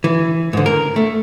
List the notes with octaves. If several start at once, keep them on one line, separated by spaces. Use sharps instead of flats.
E3
G#2 D3
A#4
A3